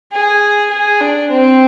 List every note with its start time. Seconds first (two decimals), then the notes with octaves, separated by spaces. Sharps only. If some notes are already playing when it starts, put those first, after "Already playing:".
0.12 G#4
0.71 G#4
1.01 D4
1.30 C4